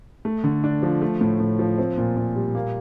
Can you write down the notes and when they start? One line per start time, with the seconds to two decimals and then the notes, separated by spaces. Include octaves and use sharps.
0.25 A3
0.44 D3
0.64 D4
0.83 F3
1.02 A3
1.21 A2
1.40 A2
1.59 F3
1.78 C4
1.98 A#2
2.17 A#2
2.36 G3
2.55 A#3